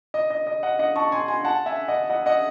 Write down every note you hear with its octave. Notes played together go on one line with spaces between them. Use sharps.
D#5
D#5
D#5
D#5 F#5
D#5 F#5
A5 C#6
G#5 C6
G#5 C6
F#5 A5
E5 G#5
D#5 F#5
D#5 F#5
D#5 F#5